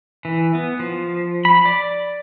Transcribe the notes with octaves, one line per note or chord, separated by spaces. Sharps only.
E3
B3
F3
B5
D5